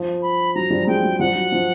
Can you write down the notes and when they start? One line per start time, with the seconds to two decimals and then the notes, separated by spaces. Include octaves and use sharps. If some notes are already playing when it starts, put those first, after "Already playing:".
Already playing: F3
0.22 B5
0.55 F#3 A#5
0.70 F3 G3
0.87 F#3 G#3 G5
1.03 F#3 G#3
1.19 F3 G3 F#5
1.35 F#3
1.52 F3